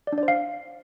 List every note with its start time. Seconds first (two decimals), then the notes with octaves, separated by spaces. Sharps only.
0.07 D5
0.13 D4
0.18 D5
0.23 C5
0.28 F5